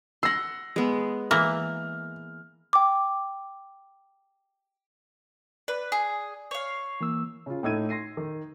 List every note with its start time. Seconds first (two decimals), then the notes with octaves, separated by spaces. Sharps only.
0.23 F#5 C6 E6 A#6
0.76 G#3 B3
1.31 E3 A#3 F6
2.73 G5 D6
5.68 B4 D5
5.92 G#4
6.51 C#5 F5
7.01 E3 A#3 E6
7.46 C#3 F4
7.63 A2 A3 D#4 E6 G#6 D#7
7.89 C6 A#6 C7 D#7
8.17 D#3